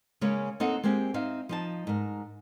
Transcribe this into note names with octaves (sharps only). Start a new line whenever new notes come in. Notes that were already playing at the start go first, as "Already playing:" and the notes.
C#3 G#3 A#3 C#4 C#5
A#3 C4 D#4 A4 D#5 F#5
G#3 A#3 C4 G4 G#4
C4 D#4 E5 F5
F3 D#4 A5
G#2 A#4